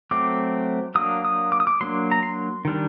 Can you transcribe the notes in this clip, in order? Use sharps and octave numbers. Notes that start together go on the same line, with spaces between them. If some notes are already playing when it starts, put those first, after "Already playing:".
F#3 A3 C4 D6
F#3 A#3 D4 D#6
D#6
D6
D#6
D6
F#3 A#3 D4 C6
A#5
C6
D#3 G3 D4